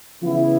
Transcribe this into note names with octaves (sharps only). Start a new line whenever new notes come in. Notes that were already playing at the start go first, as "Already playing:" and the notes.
C#3 E3 B3 E4